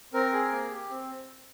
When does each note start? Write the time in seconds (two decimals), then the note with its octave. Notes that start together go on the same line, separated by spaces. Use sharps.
0.13 C4 A#4
0.33 G#4
0.52 A#3
0.70 G4
0.90 C4